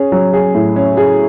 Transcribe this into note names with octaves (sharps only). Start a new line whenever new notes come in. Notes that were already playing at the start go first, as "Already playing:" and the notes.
Already playing: C#4 G#4
F#3
G#4
A2
C#4
G#4